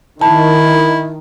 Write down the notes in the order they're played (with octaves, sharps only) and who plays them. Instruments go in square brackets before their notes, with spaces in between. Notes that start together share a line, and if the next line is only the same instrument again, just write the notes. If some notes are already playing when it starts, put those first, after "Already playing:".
[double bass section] D#3 [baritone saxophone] E4 [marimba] A5